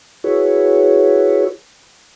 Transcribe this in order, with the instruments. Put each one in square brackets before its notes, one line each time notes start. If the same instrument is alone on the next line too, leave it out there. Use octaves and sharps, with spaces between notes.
[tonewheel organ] E4 F#4 G#4 B4 C#5